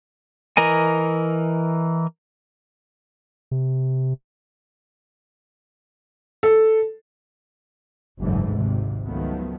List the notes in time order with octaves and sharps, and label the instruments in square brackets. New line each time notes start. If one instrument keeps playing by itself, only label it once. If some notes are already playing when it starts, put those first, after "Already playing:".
[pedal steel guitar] E3 A#4 D#5 G#5
[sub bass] C3
[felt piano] A4
[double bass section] F#1 D2 G#2 D3 E3
G#1 C3
C#2 D#3 F3 F#3 A3 B3